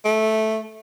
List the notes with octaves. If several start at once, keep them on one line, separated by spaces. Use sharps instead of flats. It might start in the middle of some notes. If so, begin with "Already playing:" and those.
A3